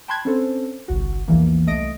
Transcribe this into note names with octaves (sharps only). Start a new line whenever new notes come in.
G5 A5 B5 C6 F#6 G#6
C4 C#4 A4 C5
G1 C2 F#4
A#1 E2 A#2 E3 A#3
C2 A3 D#5 D#6 A#6 D7